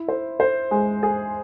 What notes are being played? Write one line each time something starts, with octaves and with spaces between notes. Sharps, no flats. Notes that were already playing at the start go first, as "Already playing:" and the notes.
Already playing: E4
C5
C5
G#3
G#4